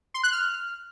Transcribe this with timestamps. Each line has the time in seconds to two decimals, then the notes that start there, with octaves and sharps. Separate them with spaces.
0.14 C6
0.23 F#6
0.32 F6